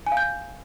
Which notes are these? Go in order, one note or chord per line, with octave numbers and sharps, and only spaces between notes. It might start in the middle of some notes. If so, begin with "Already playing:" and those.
G#5
F5
G6